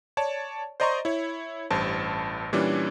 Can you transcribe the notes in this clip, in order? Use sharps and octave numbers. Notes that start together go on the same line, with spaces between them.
C#5 D5 A5
C5 D5 D#5 A#5 C6 C#6
E4 C#5
A1 G2 C5 A5
A#2 E3 G3 C#4 D4